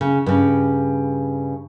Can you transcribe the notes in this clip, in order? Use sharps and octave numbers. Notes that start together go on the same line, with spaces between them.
C#3
G2 C#3